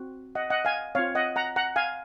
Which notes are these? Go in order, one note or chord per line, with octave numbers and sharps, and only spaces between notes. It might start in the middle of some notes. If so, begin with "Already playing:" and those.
Already playing: C4 F#4
D#5 F#5
D#5 F#5
F5 G#5
C4 F4 C#5 F5
D#5 F#5
F#5 A#5
F#5 A#5
F5 G#5